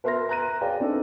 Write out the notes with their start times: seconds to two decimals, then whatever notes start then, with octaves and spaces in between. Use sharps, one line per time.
0.04 A#4 B4 E5 C6 F6 A#6
0.29 A#5 F#6 A#6 D#7
0.61 G#4 B4 C#5 D5 F5 G5
0.80 C4 D4 D#4 A4